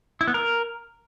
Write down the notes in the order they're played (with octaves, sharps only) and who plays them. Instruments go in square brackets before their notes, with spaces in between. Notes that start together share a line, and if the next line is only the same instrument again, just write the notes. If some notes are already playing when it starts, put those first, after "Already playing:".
[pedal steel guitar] E4
B3
A#4